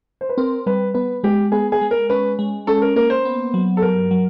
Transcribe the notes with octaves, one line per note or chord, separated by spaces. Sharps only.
C5
B4
C4 A#4
G3 B4
B3 B4
G#3 G4
B3 G#4
G#4
G#3
A#4
C#4 B4
G#3
C#4 A4
A#4
A#3 A#4
C5
B3
F#3
A4
G2 A#4
F#3